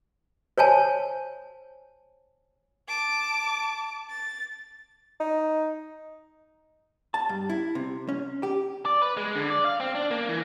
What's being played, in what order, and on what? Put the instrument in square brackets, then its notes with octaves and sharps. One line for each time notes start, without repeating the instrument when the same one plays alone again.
[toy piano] C5 C#5 G#5 A5
[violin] A5 D6
A6
[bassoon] D#4
[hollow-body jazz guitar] A5
G2
E4
C3
C#4
G4
[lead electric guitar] D5
B4
G#3
D3
D5
F5
C4
D4
A#3
E3